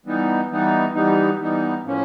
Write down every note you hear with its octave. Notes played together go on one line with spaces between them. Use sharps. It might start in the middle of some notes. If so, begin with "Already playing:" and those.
E3 G3 B3 D#4
E3 G3 B3 D#4
E3 G3 B3 D#4
E3 G3 B3 D#4
A2 F3 A#3 C#4